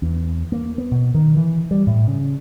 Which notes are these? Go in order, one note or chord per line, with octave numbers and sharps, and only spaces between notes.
E2
A#3
B3
B2
D#3
E3
G3
A2
C#3